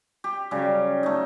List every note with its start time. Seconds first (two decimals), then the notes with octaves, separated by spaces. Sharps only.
0.24 G4
0.51 C#3 F#3 G3
1.03 A3 D#4